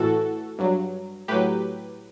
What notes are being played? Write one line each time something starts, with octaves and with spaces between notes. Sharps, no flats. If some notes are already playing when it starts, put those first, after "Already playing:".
Already playing: A2 E3 F#4 A4
G2 F#3
A2 F#3 G4 B4